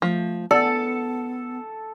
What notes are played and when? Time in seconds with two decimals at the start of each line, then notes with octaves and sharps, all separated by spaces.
0.02 F3 A3
0.51 B3 A4 D5